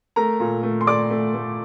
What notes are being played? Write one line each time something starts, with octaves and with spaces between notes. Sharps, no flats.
A3 A#4 A#5
A#2
A3
C6
A3 D5 D6
A3
A3